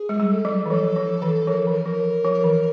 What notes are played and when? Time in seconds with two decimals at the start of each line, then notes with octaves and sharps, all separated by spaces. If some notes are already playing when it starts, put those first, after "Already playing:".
Already playing: G#4
0.09 G#3
0.20 G3
0.32 A4
0.45 F#3
0.66 E3
0.70 F3 A4
0.96 F3
1.22 E3
1.47 F3 A#4
1.58 A4
1.67 E3 A#4
1.86 F3
2.25 F3
2.44 E3